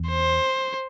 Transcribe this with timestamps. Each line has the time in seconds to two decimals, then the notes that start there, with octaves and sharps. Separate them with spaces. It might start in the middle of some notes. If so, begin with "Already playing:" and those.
Already playing: E2
0.09 C5